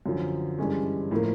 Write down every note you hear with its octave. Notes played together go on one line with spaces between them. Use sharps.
F#2 D3 F3
G2 E3 G#3 C#4
A2 F3 A#3